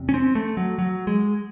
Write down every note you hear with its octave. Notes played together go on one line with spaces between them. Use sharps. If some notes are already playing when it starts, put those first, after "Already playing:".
Already playing: E2 C3
C#4
C4
A3
F#3
F#3
G#3